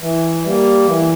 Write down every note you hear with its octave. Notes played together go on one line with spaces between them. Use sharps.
E3
G3 A#3
E3